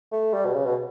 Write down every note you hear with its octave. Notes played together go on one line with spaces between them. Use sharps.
A3
G3
B2
C#3
B2